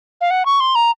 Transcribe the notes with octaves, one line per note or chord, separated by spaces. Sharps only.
F5
F#5
C#6
C6
A#5